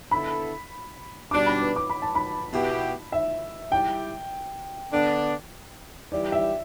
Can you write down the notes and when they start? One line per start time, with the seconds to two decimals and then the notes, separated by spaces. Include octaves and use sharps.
0.11 D3 B3 E4 A4 B5
1.31 B2 G3 D4 D6
1.46 B5
1.61 B4
1.76 D6
1.90 B5
2.02 A5
2.15 B5
2.52 B2 B3 E4 G4
3.12 E5
3.72 G3 E4 G4 G5
4.92 D3 B3 D4
6.12 E3 G3 E4 G4 D5
6.32 E5